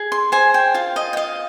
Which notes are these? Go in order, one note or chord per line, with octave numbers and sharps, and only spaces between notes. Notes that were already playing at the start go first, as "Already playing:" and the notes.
Already playing: G#4
C6
C5 G#5
G5
F4 F5
D#5
G5
D#5 F5